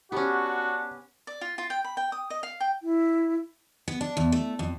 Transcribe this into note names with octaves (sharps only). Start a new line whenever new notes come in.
B3 C#4 D4 F#4 G4 F#5
D5
F4
F4
G5
B5
G5
D#6
D#5
F5
G5
E4
B3
D4
E2
A3
F2